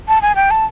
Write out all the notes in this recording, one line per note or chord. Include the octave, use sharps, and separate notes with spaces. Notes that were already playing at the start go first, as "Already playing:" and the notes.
A5
G#5
G5
A5